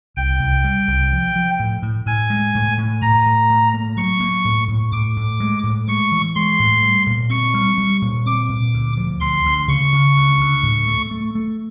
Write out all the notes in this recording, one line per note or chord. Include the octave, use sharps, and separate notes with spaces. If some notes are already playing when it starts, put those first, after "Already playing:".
C2 G5
C2
G3
C2
F3
F3
A2
A2
A2 G#5
G#3
A2
A2
A2 A#5
A2
A2
A#3
F#3 C#6
A#3
A2
A2
A2 D6
A2
G#3
A2
G#3 C#6
E3
G#3 C6
A2
G3
A#2
C4 C#6
G3
G3
A#2
C4 D6
A#2
D2
F3
D2 C6
D2
C#3 C#6
C#3
D2
D2
A2
A3
A3
A3